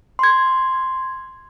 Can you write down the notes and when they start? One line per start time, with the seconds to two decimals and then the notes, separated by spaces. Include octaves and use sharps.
0.19 C6 G#6